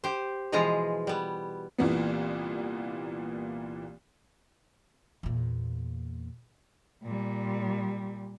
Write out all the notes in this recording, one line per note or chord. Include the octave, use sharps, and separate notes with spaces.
G4 C5
B2 E3 F3 G#3 F4 A#5
G3 B3
C2 A#2 E3 A#3 B3
E2 A#2
A#2 G3